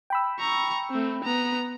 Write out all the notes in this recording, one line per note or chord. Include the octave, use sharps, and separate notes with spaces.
G5 B5 E6
A#5 C#6
A3 C4
B3 A#5